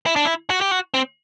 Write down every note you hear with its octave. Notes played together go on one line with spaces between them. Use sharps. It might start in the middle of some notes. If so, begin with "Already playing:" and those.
E4
D4
E4
F#4
G4
F#4
C4